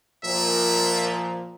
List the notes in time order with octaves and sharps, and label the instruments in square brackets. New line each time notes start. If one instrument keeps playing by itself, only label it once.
[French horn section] A#2 F3 [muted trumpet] E5